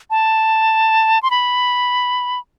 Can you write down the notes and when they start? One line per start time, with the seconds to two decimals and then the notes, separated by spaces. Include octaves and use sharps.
0.10 A5
1.23 C6
1.31 B5